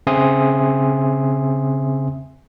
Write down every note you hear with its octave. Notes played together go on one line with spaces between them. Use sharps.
C#3 C4 E5 G#5 C6 D#6